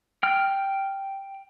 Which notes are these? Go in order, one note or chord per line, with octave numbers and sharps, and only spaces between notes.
G5 F6